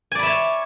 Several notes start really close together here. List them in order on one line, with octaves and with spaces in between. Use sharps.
G#5 D5 B5 E5 C#5